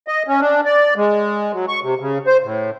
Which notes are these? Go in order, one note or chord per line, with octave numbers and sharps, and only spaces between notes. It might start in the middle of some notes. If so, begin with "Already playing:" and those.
D#5
C#4
D4
D5
G#3
F#3
C#6
C3
C#3
C5
A2